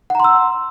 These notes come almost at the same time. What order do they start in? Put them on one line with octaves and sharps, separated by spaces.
F#5 A#5 C6 E6